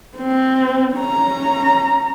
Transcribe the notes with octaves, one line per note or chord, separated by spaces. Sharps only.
C4
C#4 A#5